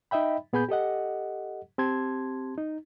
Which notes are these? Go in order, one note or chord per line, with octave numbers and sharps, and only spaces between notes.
D#4 D#5 E5 G5 B5
A#2 B3 G#4 G#5 B5 G6
G4 A4 D#5 F#5
C4 G4 A5 C6 G#6
D#4